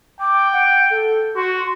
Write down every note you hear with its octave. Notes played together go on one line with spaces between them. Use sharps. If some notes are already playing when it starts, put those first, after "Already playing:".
G5 D6
F#5
A4
F#4 C6